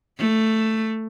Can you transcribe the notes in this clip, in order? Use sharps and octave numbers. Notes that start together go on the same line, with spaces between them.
A3